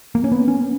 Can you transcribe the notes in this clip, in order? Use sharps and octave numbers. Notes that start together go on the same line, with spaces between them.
A#3
C#4
B3
C#4